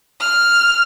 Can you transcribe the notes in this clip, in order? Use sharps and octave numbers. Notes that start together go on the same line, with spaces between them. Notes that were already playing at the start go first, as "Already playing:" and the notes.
F6